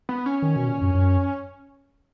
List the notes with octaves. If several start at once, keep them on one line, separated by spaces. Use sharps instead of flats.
B3
C#4
D#3
B2
A#2
F#2
F#2